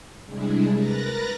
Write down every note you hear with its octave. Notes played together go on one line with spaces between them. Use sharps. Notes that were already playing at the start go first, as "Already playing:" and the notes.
C3 G3 G#3 D4 E4 G#4
A#4 B4 A#5 F#6 A6 A#6